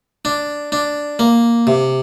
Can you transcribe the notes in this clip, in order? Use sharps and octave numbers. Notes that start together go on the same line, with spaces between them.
D4
D4
A#3
C3